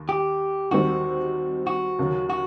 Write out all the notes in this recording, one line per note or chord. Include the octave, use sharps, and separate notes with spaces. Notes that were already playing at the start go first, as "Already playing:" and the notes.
Already playing: D#2
G4
D#2 D#3 G3 C4 F#4
F#4
D#2 C#3 F#3
F#4